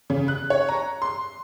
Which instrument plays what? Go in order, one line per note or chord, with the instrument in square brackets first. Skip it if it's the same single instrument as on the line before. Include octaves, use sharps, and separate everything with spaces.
[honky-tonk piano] C#3
F#6
C#5
A#5
C6